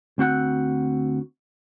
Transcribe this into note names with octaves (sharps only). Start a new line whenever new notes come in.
D2 C4 F#4 F#5